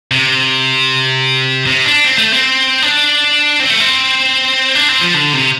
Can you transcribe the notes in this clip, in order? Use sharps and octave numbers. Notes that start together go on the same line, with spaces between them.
C3
C3
D4
C4
A3
C4
D4
C4
A3
C4
D4
C4
F3
D3
C3